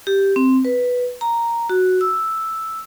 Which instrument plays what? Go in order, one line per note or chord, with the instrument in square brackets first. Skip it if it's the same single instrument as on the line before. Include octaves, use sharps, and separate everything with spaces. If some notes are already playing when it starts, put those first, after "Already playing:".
[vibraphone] G4
C4
B4
A#5
F#4
E6